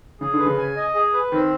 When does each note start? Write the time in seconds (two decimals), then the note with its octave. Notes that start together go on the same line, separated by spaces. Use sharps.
0.21 C#3 G#4
0.34 D3
0.39 B4
0.46 C#3
0.58 G#5
0.76 D#5
0.95 G#4
1.13 B4
1.32 D#3 C4